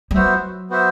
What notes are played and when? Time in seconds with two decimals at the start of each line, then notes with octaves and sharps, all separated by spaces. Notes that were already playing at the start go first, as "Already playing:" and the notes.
0.11 G3
0.15 F#3 B3 F#4 C5 E5
0.70 B3 F#4 C5 E5